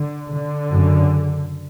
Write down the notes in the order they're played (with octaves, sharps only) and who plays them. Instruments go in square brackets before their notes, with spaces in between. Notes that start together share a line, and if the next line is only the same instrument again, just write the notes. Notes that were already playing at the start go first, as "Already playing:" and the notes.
Already playing: [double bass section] D3
D3
F#2 C#3